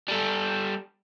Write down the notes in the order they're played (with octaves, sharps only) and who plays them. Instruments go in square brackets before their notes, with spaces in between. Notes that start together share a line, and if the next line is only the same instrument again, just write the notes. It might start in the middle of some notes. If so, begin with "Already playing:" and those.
[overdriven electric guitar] G3 A4